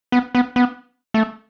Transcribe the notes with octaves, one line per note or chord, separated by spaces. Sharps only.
B3
B3
B3
A3